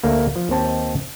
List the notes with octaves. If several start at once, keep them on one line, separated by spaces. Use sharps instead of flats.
D2 A3 A#3
F3
D#2 D#3 C4 A5